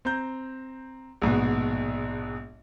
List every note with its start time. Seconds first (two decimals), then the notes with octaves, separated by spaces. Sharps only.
0.05 C4 A#5 G6
1.22 A#1 G#2 B2